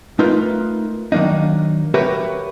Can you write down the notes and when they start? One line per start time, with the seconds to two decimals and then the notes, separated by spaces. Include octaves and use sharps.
0.19 A3 D#4 F4 A#4 B4
1.12 D#3 F#3 A#3 D4 D#4
1.94 F#4 G4 A#4 B4 C#5 E5